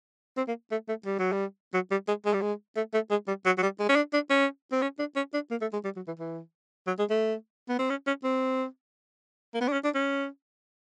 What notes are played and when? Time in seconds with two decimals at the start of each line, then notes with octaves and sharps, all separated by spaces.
0.37 C4
0.48 A#3
0.71 A3
0.89 A3
1.05 G3
1.19 F#3
1.32 G3
1.74 F#3
1.91 G3
2.08 G#3
2.25 G#3
2.33 G3
2.41 G#3
2.76 A3
2.94 A3
3.10 G#3
3.28 G3
3.45 F#3
3.58 F#3
3.62 G3
3.79 G#3
3.89 C#4
3.96 D4
4.13 D4
4.30 C#4
4.72 C4
4.82 C#4
4.99 D4
5.16 C#4
5.34 D4
5.51 A#3
5.61 A3
5.73 G#3
5.85 G3
5.96 F#3
6.07 E3
6.19 E3
6.87 F#3
6.99 G#3
7.10 A3
7.69 B3
7.79 C4
7.90 C#4
8.07 C#4
8.24 C4
9.54 A#3
9.61 B3
9.68 D4
9.73 C#4
9.84 D4
9.95 C#4